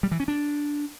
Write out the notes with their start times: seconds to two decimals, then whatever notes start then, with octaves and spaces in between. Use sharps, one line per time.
0.03 G3
0.11 E3
0.20 C#4
0.28 D4